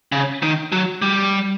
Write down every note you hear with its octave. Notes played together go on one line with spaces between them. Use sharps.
C#3
D#3
F#3
G3